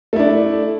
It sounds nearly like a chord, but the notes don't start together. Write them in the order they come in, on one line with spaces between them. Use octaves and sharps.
A3 E4 D4